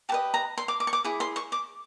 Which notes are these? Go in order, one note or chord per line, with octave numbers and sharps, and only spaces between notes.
G4 B4 D#5 A5
A#5
C6
D6
D6
C#6
D6
E4 G#4
C6
C#6
D6